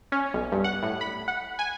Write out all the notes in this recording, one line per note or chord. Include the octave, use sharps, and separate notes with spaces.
C#4
B1
G2
F#5
A2
B5
F#5
G#5